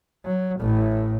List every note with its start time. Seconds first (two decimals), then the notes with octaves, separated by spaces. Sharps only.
0.25 F#3
0.60 A1 A2